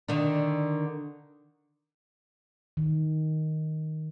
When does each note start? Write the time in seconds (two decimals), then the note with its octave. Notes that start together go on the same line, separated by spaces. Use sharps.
0.08 D3 D#3 D4
2.77 D#3